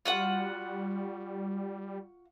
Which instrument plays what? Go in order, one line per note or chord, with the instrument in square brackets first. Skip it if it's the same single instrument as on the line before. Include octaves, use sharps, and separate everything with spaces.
[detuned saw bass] G3 [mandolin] F4 F#4 F#5